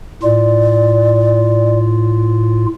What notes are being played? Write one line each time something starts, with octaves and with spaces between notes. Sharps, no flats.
A2 F4 D5